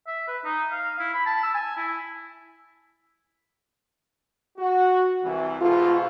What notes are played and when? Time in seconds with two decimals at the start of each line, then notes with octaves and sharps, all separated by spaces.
0.07 E5
0.27 B4
0.44 D#4
0.71 F5
0.99 E4
1.14 B5
1.26 A5
1.43 E6
1.54 G#5
1.77 E4
4.58 F#4
5.24 C2 E3
5.61 G#2 B2 F4 A4